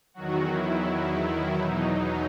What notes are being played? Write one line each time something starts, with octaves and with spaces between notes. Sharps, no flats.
E2 D#3 F#3 F#4
E4
E2 B2 F#3 D#4
D#4